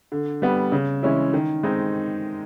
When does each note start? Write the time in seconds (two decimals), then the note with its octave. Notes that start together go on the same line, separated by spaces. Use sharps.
0.12 D3
0.42 G3 B3
0.72 C#3
1.03 E3 G#3 C#4 E4
1.33 D#3
1.63 G#3 C4 D#4